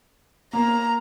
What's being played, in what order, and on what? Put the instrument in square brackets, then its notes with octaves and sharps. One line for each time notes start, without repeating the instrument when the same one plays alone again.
[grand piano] A#3 [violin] A#5